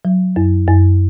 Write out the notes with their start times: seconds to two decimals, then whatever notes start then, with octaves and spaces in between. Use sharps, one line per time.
0.05 F#3
0.36 F#2
0.68 F#2